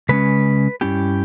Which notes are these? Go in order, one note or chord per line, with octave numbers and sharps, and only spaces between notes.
C#3 G#3 C#4 B4
G2 G3 C#4 E4 G4